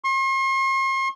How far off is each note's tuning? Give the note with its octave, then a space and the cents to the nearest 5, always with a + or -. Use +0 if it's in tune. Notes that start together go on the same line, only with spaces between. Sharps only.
C6 +45